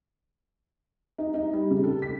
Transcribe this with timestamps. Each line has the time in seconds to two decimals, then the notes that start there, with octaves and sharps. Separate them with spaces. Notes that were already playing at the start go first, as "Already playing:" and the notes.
1.18 D#4
1.34 D#4
1.53 G3
1.71 C#3
1.84 A4
2.02 B6